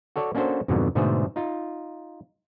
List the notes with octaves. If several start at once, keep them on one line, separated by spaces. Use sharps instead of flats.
F#4 A4 C#5 D5
A#3 C#4 D4 F#4 A4 C5
F2 G#2 B2 D3 F#3
G#2 B2 D3 A3 G#4 C5
D#4 F4